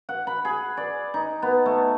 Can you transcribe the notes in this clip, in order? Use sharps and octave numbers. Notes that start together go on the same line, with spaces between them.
F#5
B5
G#4
D5
D#4
B3
A3